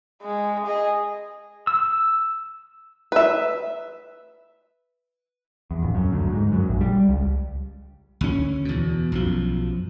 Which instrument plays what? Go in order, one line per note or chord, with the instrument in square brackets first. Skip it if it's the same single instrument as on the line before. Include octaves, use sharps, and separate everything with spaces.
[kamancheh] G#3
G#4 D#5
[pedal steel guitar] E6
[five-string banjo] B4 E5
[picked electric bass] E2
D1
F#2
D2
G#2
F#2
A#1
G3
C#2
[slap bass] D2 C#4
E2 B2
B1 F#2 F3